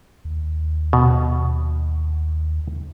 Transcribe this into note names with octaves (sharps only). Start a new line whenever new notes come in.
D#2
B2